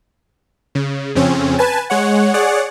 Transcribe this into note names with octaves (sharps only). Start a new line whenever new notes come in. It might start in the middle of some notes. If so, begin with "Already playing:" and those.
C#3
F2 C#3 C4 C#4
B4 G#5 A5
G#3 C#5 F#5
G#4 C#5 D5 F#5